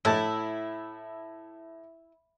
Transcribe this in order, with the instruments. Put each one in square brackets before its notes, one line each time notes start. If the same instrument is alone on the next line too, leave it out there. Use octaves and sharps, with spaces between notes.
[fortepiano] A2 A5 [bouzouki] E4